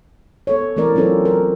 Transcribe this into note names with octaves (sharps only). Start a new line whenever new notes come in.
B3 A4 C#5
E3 A3 C4 A#4 D5
F#3 C4 C#4 F4 A4 C5
A#4